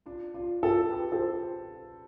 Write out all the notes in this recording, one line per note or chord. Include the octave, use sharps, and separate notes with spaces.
D4 F4
D4 F4
F4 A4
G4 B4
A4 C5